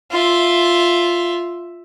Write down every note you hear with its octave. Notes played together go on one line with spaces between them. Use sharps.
F4 E5